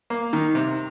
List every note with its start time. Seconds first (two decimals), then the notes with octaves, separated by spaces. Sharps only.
0.10 A#3
0.33 D#3
0.55 C3